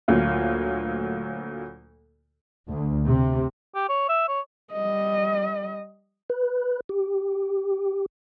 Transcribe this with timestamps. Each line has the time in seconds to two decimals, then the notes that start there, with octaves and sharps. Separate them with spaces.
0.08 D2 A#2 F#3 F4
2.70 D2
3.09 C3
3.75 G4
3.89 C#5
4.09 E5
4.28 C#5
4.72 G3 D#5
6.30 B4
6.89 G4